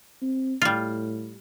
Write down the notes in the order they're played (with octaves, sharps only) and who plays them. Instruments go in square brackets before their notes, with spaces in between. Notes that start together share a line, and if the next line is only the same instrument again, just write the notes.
[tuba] C4
[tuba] A2 [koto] G3 F4